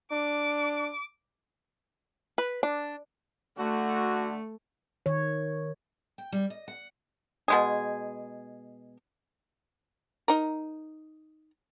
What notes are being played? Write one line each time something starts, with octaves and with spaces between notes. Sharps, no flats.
D4 D6
B4
D4
D3 A3 F#4
D#3 C#5
G5
G3
D#5
F#5
B2 G#3 G#4
D#4 A#4